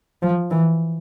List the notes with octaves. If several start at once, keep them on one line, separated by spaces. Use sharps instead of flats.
F3
E3